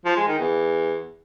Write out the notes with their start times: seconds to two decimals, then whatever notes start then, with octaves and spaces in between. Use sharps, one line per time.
0.05 F3
0.16 G#3
0.28 D#3
0.39 E2